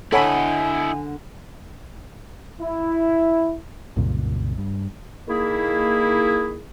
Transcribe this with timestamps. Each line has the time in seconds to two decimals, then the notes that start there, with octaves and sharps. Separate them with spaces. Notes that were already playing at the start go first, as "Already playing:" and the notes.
0.12 D3 E4 A4 C#5 D#5 F#5 G#5 B5
2.60 E4
3.96 C2 F#2 A#2 C#3
4.58 G2
5.28 D#3 A#3 E4 G#4